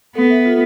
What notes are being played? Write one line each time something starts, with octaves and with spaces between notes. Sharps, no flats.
B3 A4
E5
F4